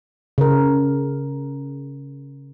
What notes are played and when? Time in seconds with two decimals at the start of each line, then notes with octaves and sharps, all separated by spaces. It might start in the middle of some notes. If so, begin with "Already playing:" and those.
0.38 C#3 A#4